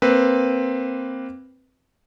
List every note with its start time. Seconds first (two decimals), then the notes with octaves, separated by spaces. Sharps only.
0.02 A#3 C4 B4